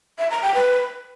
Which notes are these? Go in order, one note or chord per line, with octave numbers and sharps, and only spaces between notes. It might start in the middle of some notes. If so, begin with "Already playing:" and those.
E5
A#5
G5
B4